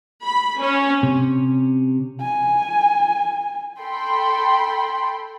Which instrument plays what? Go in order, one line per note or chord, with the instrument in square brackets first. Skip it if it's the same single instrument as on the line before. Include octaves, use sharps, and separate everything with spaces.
[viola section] B5
C#4
[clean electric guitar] C3 C#4
[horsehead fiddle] G#5
[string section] A4 G5 B5 C6